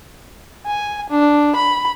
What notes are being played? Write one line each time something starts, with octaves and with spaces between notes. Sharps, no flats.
G#5
D4
B5